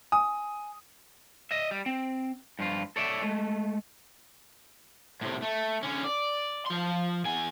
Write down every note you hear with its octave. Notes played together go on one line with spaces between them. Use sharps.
G#5 D#6
D#5 E5
G3
C4
G2 F3 F4
A4 C#5 D5 E5
G#3 A3
A2 C3
A3
D3 C#4
D5
F3 C6
E2 G#5